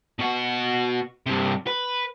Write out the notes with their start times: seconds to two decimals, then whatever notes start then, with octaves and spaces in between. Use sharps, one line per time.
0.19 B2 F#4
1.26 G2 C3
1.67 B4